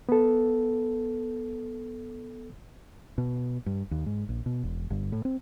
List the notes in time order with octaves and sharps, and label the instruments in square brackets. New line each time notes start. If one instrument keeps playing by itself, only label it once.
[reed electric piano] B3 A4
[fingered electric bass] B2
G2
D#2
G#2
A#1
B2
E1
G1
A2
C4